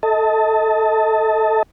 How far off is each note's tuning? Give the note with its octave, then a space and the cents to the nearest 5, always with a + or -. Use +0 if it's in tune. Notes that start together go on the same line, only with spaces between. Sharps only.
A4 +0 D#5 +35 A5 +10